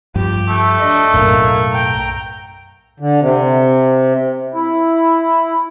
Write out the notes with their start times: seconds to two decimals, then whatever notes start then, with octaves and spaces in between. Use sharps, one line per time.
0.16 G2 F3 G4
0.49 A3
0.79 D4 D#5
1.14 B1 F#2 A2 A#3
1.73 G5 A#5
3.00 D3
3.20 C3
4.54 E4